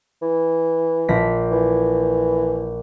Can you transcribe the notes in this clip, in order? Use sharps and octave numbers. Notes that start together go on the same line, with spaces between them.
E3
A#1 A#6 B6
E3